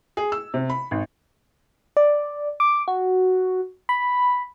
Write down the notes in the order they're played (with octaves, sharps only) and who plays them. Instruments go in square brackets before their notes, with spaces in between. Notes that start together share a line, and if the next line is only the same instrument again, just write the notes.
[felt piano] G#4
E6
C3
B5
G#1
[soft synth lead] D5
D6
F#4
B5